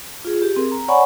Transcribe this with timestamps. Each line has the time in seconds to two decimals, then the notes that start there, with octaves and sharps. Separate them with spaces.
0.25 F4 G#4
0.42 G4
0.56 C4 G#4 A#4
0.71 A#5
0.88 C#5 D5 F#5 G#5 B5 C#6